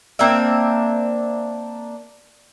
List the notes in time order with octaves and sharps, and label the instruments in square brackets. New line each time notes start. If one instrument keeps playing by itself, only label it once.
[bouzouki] A#3 C4 D4 E5